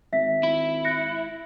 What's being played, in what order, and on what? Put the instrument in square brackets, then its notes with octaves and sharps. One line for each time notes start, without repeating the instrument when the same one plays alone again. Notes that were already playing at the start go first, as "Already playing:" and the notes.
[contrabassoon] G#1 [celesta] E5 B6
[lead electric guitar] E4
[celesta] F#6 A#6 C#7